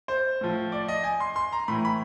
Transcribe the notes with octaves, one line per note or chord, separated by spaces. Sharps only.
C5
A2 F3
D5
D#5
G#5
C6
C6
A#5
A2 E3 B5
B5